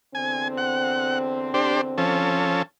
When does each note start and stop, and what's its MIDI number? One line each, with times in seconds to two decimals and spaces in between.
0.15 2.57 40
0.15 2.57 50
0.15 2.57 60
0.15 0.48 80
0.58 1.19 78
1.54 1.81 62
1.54 1.81 67
1.54 1.81 72
1.98 2.62 53
1.98 2.62 61
1.98 2.62 69